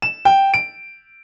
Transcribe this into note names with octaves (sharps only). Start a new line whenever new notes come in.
E7
G5
D7